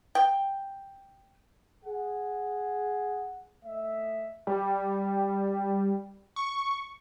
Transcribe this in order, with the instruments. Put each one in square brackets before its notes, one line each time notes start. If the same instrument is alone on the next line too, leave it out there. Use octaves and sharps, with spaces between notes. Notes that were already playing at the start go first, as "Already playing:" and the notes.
[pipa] G5
[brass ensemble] G#4 F#5
A3 D#5 E5
[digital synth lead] G3
C#6